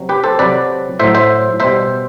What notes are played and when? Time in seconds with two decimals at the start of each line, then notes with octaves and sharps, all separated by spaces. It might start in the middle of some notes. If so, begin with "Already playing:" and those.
Already playing: C3 F#3
0.09 G4 B4
0.24 A4 C5
0.39 C3 F#3 B4 D5
0.99 A2 F#3 C5 E5
1.15 C5 E5
1.60 B2 G3 C5 E5